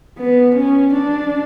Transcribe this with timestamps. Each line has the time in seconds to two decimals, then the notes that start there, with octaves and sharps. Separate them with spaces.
0.18 B3
0.55 C#4
0.93 D4